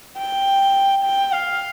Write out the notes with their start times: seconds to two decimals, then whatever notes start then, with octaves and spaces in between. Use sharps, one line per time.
0.17 G5
1.04 G5
1.33 F5